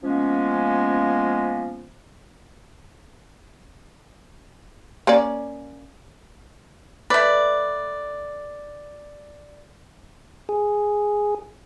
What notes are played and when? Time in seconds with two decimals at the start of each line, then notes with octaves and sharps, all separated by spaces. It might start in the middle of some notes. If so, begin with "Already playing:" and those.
0.03 F3 G#3 A#3 B3 C#4
5.07 A#3 C#4 D5
7.10 A3 B4 D5
10.49 G#4